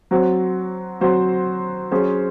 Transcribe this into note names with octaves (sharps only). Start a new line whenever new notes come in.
F#3 C4 F#4 C5
F#3 C4 F#4 C5
F#3 C#4 G#4 C5